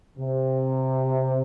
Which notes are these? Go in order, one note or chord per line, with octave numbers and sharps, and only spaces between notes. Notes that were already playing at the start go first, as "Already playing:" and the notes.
C3